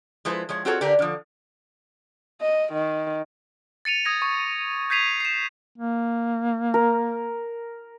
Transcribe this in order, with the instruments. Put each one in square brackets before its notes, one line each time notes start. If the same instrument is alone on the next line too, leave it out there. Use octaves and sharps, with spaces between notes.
[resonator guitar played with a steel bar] F3 G#3 E4 B4 C5
F3 G#3 C#5
C4 F4 F#4 G#4 A4 C#5
D3 D4 G4 A#4 B4
D3 F3
[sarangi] D#5
D#3
[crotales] A6 C#7 D#7 F7
D#6 G#6 A#6
C#6
G6 G#6 B6 C7 D#7 F7
C7 E7
[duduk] A#3
[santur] A#4